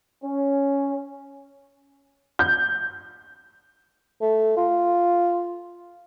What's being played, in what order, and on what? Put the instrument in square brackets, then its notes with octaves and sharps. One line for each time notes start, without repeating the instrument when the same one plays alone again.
[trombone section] C#4
[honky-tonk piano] G6
[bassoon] A3
F4